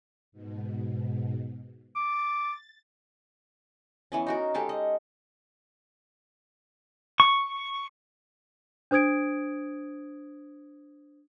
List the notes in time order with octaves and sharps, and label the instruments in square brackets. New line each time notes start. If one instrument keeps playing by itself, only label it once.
[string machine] G#2 B2
[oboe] D6 [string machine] A6
[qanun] E3 B3 C#4
D#4 F#4 A#4
G#3 G4 A4 F5
D#5
[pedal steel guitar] C#6
[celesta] D4 C5 D#6 G#6 D7